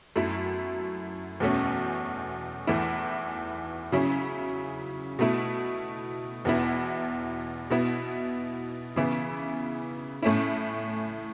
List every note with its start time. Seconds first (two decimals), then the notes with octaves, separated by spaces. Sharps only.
0.16 F#2 F#3 A3 E4
1.40 E2 B2 A3 C#4
2.67 E2 E3 A3 E4
3.92 C#3 F#3 C#4 E4
5.19 B2 A3 E4
6.45 E2 B2 B3 E4
7.70 B2 B3 E4
8.96 C#3 E3 B3 E4
10.22 A2 A3 C#4 E4